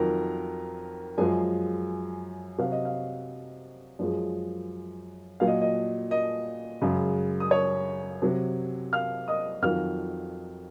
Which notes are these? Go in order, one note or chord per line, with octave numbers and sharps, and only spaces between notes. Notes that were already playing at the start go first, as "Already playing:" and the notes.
Already playing: F2 D#3 F#3 A#4 A#5
F#2 F3 G#3 G#4 G#5
C3 F#3 F5
D#5
F5
F#2 F3 G#3
A#2 F#3 F5
D#5
D#5
D#5
F#2 C#3 G#3
D#6
C#5 C#6
C3 F#3
F5 F6
D#5 D#6
F2 D#3 F#3 F5 F6